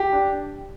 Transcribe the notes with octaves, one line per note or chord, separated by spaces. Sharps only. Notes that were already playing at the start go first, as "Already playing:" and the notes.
Already playing: G4
D4